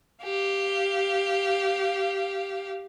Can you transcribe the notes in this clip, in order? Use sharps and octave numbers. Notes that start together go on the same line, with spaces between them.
G4 F5